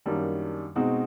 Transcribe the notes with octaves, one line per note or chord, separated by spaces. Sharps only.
F#2 D#3 G3 A#3 D4
B2 G#3 C4 D#4 F#4